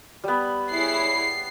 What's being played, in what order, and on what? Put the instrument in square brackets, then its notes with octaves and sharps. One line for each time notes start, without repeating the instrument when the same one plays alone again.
[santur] G3 B3 [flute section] B5
[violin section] E4 G#4 C#5 [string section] C7